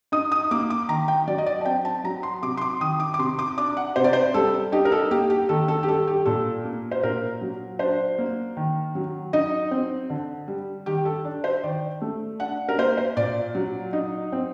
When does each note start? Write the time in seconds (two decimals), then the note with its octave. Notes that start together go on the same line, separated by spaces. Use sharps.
0.12 D#4 D#6
0.32 D#6
0.51 A#3 D6
0.70 D6
0.89 D#3 A#5
1.08 G5
1.27 F#3 D5
1.38 D#5
1.46 D5
1.61 A5
1.65 C4 G5
1.85 A5
2.04 F#3 A#5
2.23 C6
2.42 C3 D6
2.57 C6
2.61 D6
2.81 D#3 D#6
3.00 D6
3.14 D6
3.19 C3 C6
3.39 D6
3.57 D4 D6
3.77 F#5
3.96 C3 C5
4.04 D5
4.13 C5
4.34 G3 A4
4.72 D#4 G4
4.85 A#4
4.92 A4
5.11 A#3 G4
5.30 G4
5.49 D#3 A4
5.68 A4
5.83 G4
5.88 G3 A4
6.07 G4
6.26 A#2 A4
6.65 A#3
6.91 C5
7.03 A#2 A#4
7.41 F#3
7.79 D4 C5
8.18 A#3
8.57 D#3
8.95 F#3
9.33 D#4 D#5
9.71 C4
10.10 D3
10.48 G3
10.86 D#3 G4
11.05 A4
11.25 D4
11.44 C5
11.64 D#3 D5
12.02 A3
12.40 D4 F#5
12.69 A#4
12.78 A#3 C5
12.97 C5
13.17 A#2 D5
13.55 F#3
13.93 D#4
14.32 C4